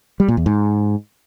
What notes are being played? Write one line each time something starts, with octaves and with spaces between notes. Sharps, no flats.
G3
A#2
E2
G#2